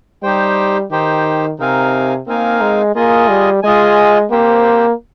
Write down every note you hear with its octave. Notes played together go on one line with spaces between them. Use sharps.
G3 D#4 G4 C5 G5
D#3 D#4 G4 C5 G5
C3 C4 D#4 A#4 F5 G#5
A#3 C4 D#4 A#4 F5 G#5
G#3
A#3 F4 G#4 D#5 G#5
G3
G#3 F4 G#4 D#5 G#5
A#3 C4 G4 C5 G5